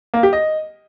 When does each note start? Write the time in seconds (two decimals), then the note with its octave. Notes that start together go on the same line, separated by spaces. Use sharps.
0.14 A#3
0.23 G4
0.33 D#5